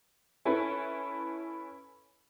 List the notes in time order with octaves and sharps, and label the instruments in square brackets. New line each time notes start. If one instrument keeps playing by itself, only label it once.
[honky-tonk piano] C#4 E4 A4 B4